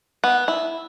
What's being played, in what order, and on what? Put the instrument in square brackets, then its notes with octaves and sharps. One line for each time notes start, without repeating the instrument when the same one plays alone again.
[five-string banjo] B3
E4